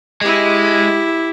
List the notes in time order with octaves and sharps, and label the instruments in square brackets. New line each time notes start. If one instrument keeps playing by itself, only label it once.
[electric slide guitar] G#3 [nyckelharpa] E4 G4